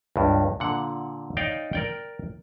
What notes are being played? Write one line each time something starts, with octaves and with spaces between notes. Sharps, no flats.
C#2 G2
A#2 D3 F#5
D#4 C#5 D5 F5 G5
A#4 D5 G5